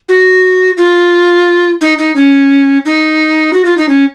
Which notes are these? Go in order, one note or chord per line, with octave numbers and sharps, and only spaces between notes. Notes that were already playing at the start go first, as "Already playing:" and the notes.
F#4
F4
D#4
D#4
C#4
D#4
F#4
F4
D#4
C#4